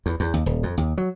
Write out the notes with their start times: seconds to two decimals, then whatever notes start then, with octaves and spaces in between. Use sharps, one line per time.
0.06 E2
0.20 E2
0.34 D#2
0.46 D#1
0.63 F2
0.77 D#2
0.98 F#3